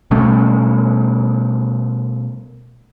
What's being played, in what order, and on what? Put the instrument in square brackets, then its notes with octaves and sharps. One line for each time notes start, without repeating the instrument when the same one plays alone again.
[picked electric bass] B2 G3 A3 C#4